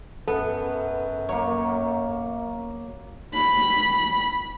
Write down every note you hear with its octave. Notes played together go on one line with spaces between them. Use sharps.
F#2 B3 A4
F#3 A#3 C#5
B5